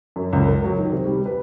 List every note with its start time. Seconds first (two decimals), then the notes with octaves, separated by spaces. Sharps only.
0.16 F#2
0.33 C#2
0.48 A#4
0.64 F#3
0.79 D#3
0.92 C3
1.05 G3
1.26 B4